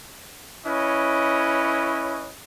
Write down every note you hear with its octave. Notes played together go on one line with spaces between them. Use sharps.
C#4 E4 B4 C#5 D#5